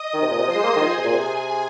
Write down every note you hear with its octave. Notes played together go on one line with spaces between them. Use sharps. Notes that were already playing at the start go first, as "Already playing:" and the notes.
Already playing: D#5 D#6
D#3
C3
A#2
C3
F3 C5 C6
G#3
A#3
G#3
D#3
F3 G#4 G#5
C3
A#2
C3